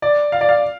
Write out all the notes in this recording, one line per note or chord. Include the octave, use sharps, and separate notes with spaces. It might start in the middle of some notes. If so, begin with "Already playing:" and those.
D5
F5
D5
F5